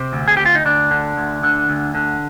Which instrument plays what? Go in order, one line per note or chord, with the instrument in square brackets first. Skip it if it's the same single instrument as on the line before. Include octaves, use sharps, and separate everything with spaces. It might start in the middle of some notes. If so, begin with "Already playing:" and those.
Already playing: [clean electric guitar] C3 C4
D2
G#4
D2 G4
F4
D#4
D2 D4
D3
D2
D3
D2
D3